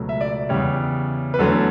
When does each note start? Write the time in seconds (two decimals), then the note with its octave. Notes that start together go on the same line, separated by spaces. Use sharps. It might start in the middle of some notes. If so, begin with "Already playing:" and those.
Already playing: C#2 B2 F#3 A3
0.09 E5
0.21 D5
0.49 E2 C#3 G3 C#5
1.34 B4
1.39 E2 D3 F#3 A3 A4